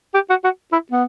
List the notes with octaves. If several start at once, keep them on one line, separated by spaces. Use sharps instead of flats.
G4
F#4
F#4
E4
B3